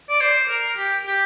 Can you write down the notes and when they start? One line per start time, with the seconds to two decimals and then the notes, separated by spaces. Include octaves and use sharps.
0.09 D5
0.21 C5
0.49 A#4
0.77 G4
1.06 G4